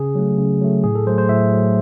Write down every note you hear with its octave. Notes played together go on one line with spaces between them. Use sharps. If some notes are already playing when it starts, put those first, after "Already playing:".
Already playing: C#3 G#4
F#3 A3
C#3
F#3 A3
A2 G#4
A4
F#3 A3 C5
C5
A2 E5
F#3 A3